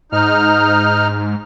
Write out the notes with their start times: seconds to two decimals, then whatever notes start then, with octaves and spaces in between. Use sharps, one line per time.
0.12 G#2 D#4 F6